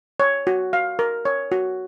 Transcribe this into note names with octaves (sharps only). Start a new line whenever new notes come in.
C#5
F#4
F5
A#4
C#5
F#4